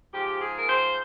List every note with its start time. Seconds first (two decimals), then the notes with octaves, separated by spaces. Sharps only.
0.13 G#2 F3 G4
0.42 G#4
0.58 A#4
0.68 C5